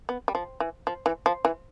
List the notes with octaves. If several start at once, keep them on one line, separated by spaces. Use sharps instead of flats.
B3
G3
F3
E3
F3
E3
F3
E3